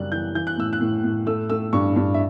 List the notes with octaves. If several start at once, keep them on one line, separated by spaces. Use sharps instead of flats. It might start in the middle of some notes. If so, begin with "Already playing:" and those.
Already playing: F#2 C#3 G3 F#6
E3 G6
E3 G6
F#6
A2 E6
F#6
A2
A2
A3 E6
A3 E6
G2 C#6
G2
E5